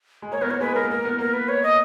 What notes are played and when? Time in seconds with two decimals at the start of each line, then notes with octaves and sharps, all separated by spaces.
0.22 G#3
0.32 A#3 C#5
0.41 B3 A#4
0.51 A#3 C#5
0.60 G#3 B4
0.75 A#3 A#4
0.90 A#3 A#4
1.05 B3
1.19 A#3 A#4
1.34 B4
1.49 C#5
1.63 D#5